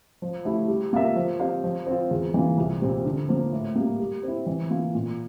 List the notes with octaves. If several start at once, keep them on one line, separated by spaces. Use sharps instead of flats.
F3
A3 E4 G4
G3
A#3 F4 A#4 E5
F3
C4 G4 C5 F5
F3
C4 F4
E2
E3 A#3 F4
C2
A#2 G3 C4
D3
F3 A#3
A2
G3 A#3
G3
C4 E4
E3
A#3 F4
A#2